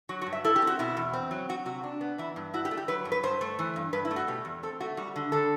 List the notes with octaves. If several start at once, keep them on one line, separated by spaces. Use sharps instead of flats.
F#3 F#4
F#4
G2
E5
E4 A4
G4
C4
F#4
B2 E4
E2
C4
F#3
F#3 F#4
C3 F#4
D4
B3
E3 E4
G2
E4 F#4
G4
A3
G4
F#3 B4
G2
B4
G2 C5
A3
E3
G2
G2 B4
E4
A3
F#4
B2 G4
E2
C4 A4
A3 F#4
G3 F#4
D3
D3 A4